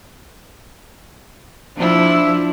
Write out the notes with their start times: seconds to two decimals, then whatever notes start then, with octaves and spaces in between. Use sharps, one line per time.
1.76 F3 D4 E4